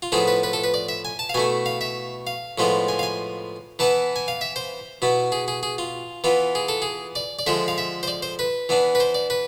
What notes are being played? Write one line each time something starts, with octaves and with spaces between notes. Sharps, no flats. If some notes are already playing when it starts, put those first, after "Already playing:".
F4
A2 F3 B3 E4 G#4
B4
B4
A4
B4
D5
E5
G#5
A5
F5
B2 A3 E4 G#5
F5
E5
F5
A2 F3 G#3 B3 F4
G#5
F5
G#5
E3 B3 E4 A5
G#5
F5
E5
C5
B2 B3 E4
G#4
G#4
G#4
F4
E3 B3 F4
G#4
A4
G#4
D5
D5
D3 F3 G#3 E5
F5
E5
C5
D5
C5
B4
E3 B3 D4
B4
C5
D5
B4